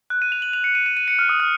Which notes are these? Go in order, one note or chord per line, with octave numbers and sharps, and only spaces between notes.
F#6
D#7
F7
F#7
F7
C#7
D#7
D#7
D#7
C#7
F6
D#6
F6